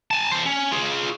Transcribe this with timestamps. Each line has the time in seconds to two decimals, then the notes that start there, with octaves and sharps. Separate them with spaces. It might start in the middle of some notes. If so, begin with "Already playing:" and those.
0.11 G#5 A5
0.31 A4 C5
0.45 C#4
0.72 F4 G#4